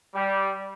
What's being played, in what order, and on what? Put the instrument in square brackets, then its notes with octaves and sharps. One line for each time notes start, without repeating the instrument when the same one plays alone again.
[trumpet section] G3